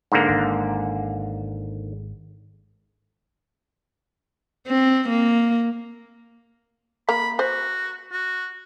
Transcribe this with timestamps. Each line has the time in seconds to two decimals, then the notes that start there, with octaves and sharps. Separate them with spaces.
0.12 G#2 D3 A#3
0.29 G#1
4.67 C4
5.09 A#3
7.09 A#3 A#5 B5
7.39 F#4 C5
8.12 F#4